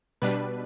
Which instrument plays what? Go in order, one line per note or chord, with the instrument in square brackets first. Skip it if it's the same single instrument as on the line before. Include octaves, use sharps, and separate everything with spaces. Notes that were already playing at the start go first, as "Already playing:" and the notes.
[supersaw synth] B2 G3 D4 B4